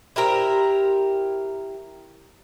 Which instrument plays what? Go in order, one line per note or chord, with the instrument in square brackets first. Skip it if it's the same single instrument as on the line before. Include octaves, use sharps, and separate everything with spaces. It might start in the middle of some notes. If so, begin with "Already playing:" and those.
[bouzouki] E4 G4 A#4 C5